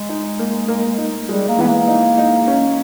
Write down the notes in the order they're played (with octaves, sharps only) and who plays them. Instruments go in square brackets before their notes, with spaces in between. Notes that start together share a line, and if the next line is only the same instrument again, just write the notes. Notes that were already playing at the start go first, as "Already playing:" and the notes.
Already playing: [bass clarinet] G#3
[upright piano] D#4
A#3
A#3
D#4
[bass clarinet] G3 [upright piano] G#3
[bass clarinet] A#3
[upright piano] E3 [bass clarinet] B3
[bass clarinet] A#3
[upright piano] D#4
D#4
C#4